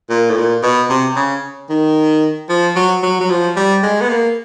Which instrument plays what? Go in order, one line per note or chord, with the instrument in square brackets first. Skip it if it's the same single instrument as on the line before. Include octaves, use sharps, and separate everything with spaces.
[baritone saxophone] A#2
A2
A#2
B2
C3
C#3
D#3
F3
F#3
F#3
F#3
F3
G3
G#3
B3
A#3